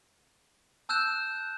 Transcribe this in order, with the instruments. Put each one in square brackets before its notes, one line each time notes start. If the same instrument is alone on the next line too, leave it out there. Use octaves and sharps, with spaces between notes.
[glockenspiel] A5 E6 F#6 G6 E7